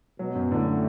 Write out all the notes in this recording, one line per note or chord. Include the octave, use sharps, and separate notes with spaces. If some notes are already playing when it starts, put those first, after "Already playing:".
B2 F#3
F#2
A2 D3